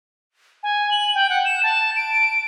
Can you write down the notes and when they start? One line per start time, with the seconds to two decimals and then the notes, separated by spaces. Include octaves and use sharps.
0.63 G#5
0.91 F#7
1.15 G5
1.30 F#5
1.45 E7
1.63 A5
1.96 D7